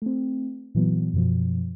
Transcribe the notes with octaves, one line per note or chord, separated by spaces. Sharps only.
A3 C4
A#2 E3 F#3 B3
F#2 B2 F3